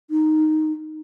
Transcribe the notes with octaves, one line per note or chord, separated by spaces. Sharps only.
D#4